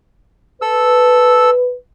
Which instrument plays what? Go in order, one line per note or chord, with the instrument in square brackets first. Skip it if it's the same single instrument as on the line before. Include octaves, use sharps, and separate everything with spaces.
[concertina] A4 E6 [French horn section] B4